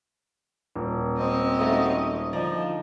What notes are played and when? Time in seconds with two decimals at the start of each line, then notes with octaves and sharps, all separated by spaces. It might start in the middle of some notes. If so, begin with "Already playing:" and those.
0.76 D#1
1.18 G#3 C4 C#4 D#5
1.59 A3 D#4 F#4
2.33 D3 F3 D#4 D5 D#5